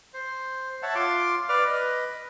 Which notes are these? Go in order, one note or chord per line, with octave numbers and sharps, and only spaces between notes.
C5
C#5 E5 F#5 A5
F4 C6 D6
B4 D5 D6 F6
B4 D#5